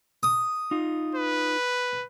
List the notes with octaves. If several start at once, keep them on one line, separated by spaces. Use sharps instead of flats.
D#6
D#4 F4
B4